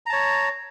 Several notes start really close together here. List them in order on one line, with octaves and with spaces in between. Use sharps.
A#5 A5 C#5